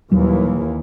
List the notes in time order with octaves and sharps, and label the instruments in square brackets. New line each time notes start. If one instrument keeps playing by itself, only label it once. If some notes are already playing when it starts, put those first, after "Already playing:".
[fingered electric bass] D#1 F#3 G3 [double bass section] D#2 E3